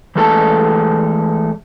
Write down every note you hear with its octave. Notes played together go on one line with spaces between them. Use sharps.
E3 G#3 A3 A4 E5 A5